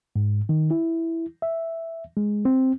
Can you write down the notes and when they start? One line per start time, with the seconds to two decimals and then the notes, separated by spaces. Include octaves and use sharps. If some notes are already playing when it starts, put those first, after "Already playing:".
0.16 G#2
0.49 D#3
0.71 E4
1.42 E5
2.17 G#3
2.45 C4